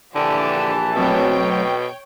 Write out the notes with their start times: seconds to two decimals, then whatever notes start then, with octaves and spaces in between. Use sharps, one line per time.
0.15 A#1 D3 E3 G4 A5 E7
0.96 B2 F#3 A3 C4 C#5 G5